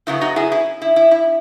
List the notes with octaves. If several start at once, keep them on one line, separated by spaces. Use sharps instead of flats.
F#2 C#3 F#3 B3 E4
D#4 F#4
E4 G#4
E4
E4
E4
E4